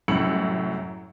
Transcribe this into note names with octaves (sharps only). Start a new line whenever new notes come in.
C2 F#2 A2 E6 C#7 F#7